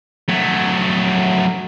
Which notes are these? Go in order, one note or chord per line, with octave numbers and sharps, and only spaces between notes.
F#3 A3